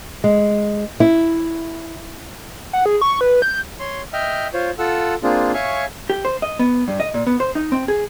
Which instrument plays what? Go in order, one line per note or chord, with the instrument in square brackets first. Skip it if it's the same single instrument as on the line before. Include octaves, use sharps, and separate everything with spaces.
[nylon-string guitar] G#3
E4
[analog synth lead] F#5
G#4
C#6
B4
G6
[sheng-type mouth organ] C#5 C6
D#5 E5 G5 F6
F4 C5 C#5
F4 A4 F#5 E6
A#3 C4 D4 F4 G#4
C#5 E5 F5 G#5 C#6
[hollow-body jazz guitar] G4
C5
D#5
B3
G2
D#5
A#2
B3
C5
D#4
C4
G#4